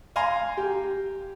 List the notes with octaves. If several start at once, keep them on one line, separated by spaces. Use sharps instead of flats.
F5 G#5 A#5 C6
G4